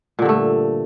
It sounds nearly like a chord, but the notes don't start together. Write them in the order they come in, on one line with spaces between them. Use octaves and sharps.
A#2 D3 G2 A3